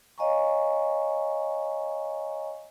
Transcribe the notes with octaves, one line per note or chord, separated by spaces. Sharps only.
C#5 D#5 F5 G#5 A#5 C#6